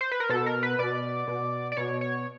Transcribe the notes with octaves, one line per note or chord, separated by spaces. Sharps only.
C5
B4
A#4
B2 A4
A#4
B4
B2 D5
B2
D5
B2 C#5
C#5